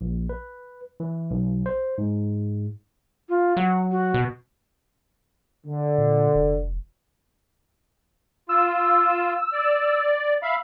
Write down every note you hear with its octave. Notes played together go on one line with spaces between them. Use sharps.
A#1
B4
E3
B1
C5
G#2
F4
F#3 F#5
F#4
B2
D3
A#2
F1
F4 E6
D5
E5 F5 B5